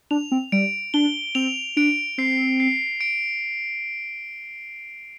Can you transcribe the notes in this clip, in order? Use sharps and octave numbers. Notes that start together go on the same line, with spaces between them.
D4 F7
C4
G3 D7
D4 G7
C4 F7
D4 D7
C4 C7
C7
D7